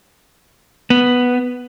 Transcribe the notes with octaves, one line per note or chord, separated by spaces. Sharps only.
B3